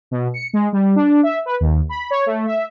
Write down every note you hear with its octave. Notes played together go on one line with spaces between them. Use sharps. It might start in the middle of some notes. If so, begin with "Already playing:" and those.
B2
C#7
G#3
G3
D4
E5
B4
D#2
B5
C#5
A3
E5